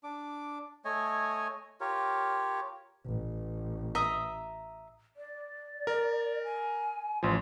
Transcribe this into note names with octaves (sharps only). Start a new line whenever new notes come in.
D4 D6
A3 C#5 D#5 G#5
F4 G4 A#4 C#5
A1
D#5 E5 A#5
D5
A#4
G#5
A1 F3 C6